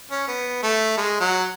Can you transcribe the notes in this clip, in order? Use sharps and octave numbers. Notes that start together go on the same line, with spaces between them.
C#4
B3
A3
G#3
F#3